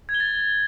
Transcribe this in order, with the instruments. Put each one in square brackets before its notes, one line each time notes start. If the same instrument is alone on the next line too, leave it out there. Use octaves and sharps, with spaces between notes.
[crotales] G#6
G7
A6